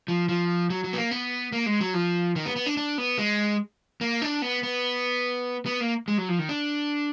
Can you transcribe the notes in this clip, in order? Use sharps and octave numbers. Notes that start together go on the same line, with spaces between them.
F3
F3
F#3
F#3
B3
A#3
B3
A#3
G#3
F#3
F3
D#3
B3
B3
D4
D4
B3
G#3
A#3
D4
B3
B3
B3
A#3
G#3
F#3
F3
D#3
D4